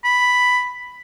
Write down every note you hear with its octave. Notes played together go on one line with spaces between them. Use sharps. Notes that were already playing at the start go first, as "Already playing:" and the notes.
B5